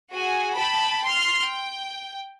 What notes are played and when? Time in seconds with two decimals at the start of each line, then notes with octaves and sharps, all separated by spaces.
0.13 F#4 G#4 G#5
0.55 G5 A5 B5
1.06 C6 F6
1.42 G5